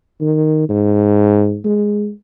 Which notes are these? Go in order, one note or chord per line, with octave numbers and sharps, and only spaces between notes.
D#3
G#2
G#3